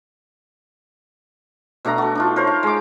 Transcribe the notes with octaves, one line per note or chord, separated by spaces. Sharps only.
B2 A3 D4 A#5
F#4 A4
D4 D#4 F4
A#4 C5 C#5
F5
G#3 D6